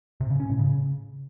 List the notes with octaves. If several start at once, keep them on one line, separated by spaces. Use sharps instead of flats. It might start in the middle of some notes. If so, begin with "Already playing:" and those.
C3
C#3
C#4
A2
C#3